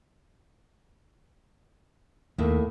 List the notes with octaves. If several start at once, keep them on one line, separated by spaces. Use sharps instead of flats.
D#2 A2 A#3 E4